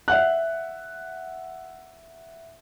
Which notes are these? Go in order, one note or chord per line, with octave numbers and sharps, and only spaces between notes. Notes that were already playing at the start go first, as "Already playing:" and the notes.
E5 F#5 F#6